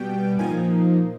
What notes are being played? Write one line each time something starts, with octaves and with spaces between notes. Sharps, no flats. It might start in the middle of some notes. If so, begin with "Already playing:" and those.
Already playing: B2 G3 B3 G5
A#2 F3 A#3 D#4 G#5